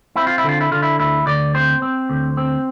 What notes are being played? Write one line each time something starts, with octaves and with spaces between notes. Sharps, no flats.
C4 E4
F4
E4
D3
F4
E4
D3 F4
E4
D2 E4
D2 D5
C4 C5
C4
D2
C4